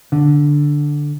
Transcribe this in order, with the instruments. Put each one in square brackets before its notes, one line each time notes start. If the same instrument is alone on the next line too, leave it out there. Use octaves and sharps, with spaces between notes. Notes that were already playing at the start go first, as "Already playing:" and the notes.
[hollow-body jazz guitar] D3